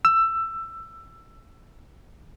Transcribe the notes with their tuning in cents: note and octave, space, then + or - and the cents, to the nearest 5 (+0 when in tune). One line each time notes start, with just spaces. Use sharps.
E6 +15